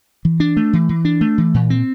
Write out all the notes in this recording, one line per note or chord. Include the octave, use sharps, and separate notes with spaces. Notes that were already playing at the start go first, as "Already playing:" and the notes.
E3
D4
A3
E3
E3
D4
A3
E3
A#2
C4